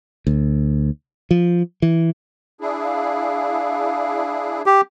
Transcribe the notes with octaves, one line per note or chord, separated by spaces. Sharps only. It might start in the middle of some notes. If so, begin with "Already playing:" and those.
D2
F3
E3
D4 E4 G#4
F5
G4